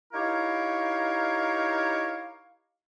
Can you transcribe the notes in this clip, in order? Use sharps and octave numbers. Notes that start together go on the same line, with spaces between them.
D#4 E4 G4 A#4 C#5 F5